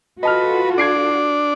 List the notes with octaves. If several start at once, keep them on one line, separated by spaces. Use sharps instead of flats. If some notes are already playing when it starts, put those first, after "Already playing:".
F4 F#4 A4 B4 D#5 A5 F6
D4 G#6 C7 D7